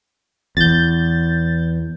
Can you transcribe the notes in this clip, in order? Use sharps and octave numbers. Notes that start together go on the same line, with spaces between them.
E2 G6 A6